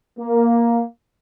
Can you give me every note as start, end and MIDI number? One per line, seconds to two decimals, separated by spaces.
0.19 0.82 58